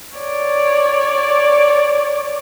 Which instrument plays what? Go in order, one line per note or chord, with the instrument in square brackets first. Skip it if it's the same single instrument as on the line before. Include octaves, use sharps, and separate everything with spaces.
[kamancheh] C#5 D5